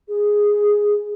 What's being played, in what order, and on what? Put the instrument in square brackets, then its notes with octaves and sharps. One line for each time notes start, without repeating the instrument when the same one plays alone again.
[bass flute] G#4